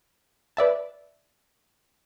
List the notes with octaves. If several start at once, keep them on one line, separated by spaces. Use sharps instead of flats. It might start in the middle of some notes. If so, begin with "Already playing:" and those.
B4 D5 E5 A5